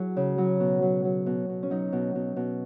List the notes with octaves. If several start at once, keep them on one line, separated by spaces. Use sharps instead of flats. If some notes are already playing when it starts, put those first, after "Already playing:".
Already playing: F#3 E4 F#4 G#4
C#3
F#3
B2
F#3
F#3
B2
B2
C#4
F#3 D#4
B2
B2
B2